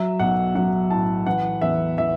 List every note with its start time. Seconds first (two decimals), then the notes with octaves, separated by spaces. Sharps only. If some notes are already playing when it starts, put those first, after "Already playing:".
Already playing: F#3 E5
0.20 B1 F#5
0.55 F#3 F#5
0.90 A2 A5
1.26 E3 F#5
1.62 E2 E5
1.98 E3 E5